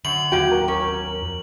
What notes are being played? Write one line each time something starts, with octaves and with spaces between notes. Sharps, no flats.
F#2 D3 F#7
D#2 F#3 A#3 F#4 G5
A#4
C#4
F2